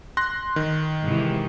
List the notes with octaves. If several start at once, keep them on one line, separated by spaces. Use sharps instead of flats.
C6 F#6 A#6
D#3
G#2 C3 E3